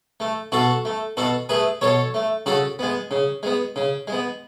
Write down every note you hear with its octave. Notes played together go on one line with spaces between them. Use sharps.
A3
B2 F#4 A4
A3
B2 F#4 A4
A3 G#4 B4
B2 A4 C#5
A3
C#3 F#4 A4
G#3 B3
C#3
G#3 B3
C#3
G#3 B3